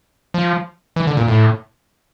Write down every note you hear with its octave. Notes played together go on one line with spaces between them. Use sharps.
F3
E3
D3
A#2
A2